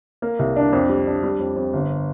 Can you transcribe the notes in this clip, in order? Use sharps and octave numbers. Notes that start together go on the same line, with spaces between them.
A#3
C2
D4
F2
G3
D4
G3
F2
F2
G1